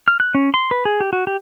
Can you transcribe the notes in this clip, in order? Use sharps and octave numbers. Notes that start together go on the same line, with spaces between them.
F6
F#6
C#4
C6
B4
G#4
G4
F#4
G4